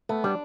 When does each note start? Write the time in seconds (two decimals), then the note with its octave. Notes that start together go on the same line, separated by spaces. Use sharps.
0.09 A3 B3
0.24 G3 D4